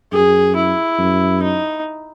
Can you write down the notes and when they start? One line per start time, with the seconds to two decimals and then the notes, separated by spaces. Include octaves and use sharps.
0.12 F#2 G#4
0.56 E4
0.99 F#2
1.42 D#4